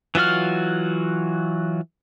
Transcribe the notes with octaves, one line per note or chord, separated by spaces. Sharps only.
E3 F#3 F4 F#4 F6